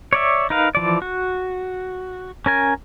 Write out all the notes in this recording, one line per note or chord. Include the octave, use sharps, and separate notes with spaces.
C#5 D5 E5
D#4 A#4 B4 F5
E3 F3 D5
F#4
C#4 A#4 G#5